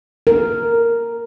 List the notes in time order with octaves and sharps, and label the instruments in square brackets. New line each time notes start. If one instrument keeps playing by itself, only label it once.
[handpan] A#4